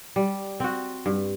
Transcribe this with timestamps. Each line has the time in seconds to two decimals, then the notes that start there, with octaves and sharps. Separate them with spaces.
0.16 G3
0.60 C4 F#4
1.06 G2